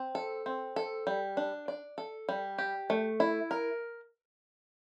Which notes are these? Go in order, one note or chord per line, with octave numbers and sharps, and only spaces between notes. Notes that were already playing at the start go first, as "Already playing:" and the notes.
Already playing: C4
A4
C4
A4
G3
D4
D5
A4
G3
G4
A3
E4
A#4